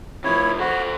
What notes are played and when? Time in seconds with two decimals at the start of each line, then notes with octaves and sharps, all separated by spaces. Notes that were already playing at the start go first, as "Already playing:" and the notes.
0.24 C3 F3 E4 C#5
0.60 F#4 A4 C5